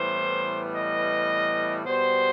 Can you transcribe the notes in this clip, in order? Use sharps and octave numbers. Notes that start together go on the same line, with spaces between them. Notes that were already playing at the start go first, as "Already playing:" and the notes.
Already playing: A2 E3 G3 B3 C5
D#5
B2 G3 B3 C5